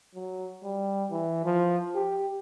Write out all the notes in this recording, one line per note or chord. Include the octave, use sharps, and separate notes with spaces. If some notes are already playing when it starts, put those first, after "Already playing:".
F#3
G3
E3
F3
G4